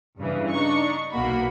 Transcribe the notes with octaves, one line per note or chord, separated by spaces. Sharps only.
G2 C#3 E3
D4 D#4 C#6
B1 B2 A#3 F#4 B5